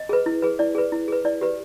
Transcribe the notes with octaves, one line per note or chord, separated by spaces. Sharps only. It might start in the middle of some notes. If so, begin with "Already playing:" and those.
Already playing: D#5
G#4 B4
E4
G#4 B4
E4 D5
G#4 B4
E4
G#4 B4
E4 D5
G4 B4